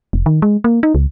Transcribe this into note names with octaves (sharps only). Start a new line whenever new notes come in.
F1
D#3
G#3
A#3
D#4
C#2